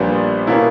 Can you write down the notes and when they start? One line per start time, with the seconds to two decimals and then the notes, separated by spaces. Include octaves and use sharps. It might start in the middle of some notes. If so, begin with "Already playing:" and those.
Already playing: A#1 A#2 G3 B3 D4
0.47 B2 A#3 C#4 E4